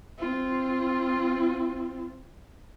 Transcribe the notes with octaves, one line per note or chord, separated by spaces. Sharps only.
C4 F4